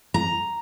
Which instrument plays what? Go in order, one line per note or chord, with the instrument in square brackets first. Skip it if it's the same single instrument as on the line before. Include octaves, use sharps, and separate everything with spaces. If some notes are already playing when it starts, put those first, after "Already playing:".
[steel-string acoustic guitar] A#5